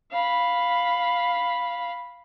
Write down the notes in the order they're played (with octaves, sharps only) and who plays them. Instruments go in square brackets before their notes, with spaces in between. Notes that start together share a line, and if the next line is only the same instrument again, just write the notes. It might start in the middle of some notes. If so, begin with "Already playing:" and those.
[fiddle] F5 B5